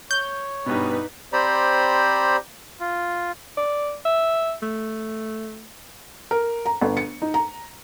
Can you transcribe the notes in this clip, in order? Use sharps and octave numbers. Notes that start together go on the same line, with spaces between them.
C#5 G6
G2 B2 B3 D#4 B4
C4 G4 C5 D5 A#5 B5
F4
D5
E5
A3
A#4
A#5
G1
C#7
D#4
A#5